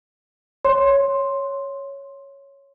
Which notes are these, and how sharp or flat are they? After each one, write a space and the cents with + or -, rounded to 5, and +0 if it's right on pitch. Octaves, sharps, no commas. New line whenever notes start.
C#5 +0 C6 +5